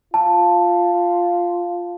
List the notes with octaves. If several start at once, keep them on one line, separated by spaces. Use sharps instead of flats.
F4 A5